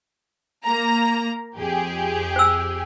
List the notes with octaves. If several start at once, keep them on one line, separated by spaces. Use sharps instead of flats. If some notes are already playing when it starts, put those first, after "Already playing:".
A#3 A#5
F2 G4 G#4
C5 E6